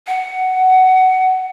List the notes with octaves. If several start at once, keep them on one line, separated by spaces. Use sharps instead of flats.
F#5